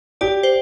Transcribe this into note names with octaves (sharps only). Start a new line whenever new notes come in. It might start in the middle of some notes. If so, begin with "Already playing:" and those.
G4 D5
C5